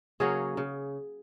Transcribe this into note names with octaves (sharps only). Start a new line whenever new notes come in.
C#3 F#3 A#3 C#4 G#4
C#3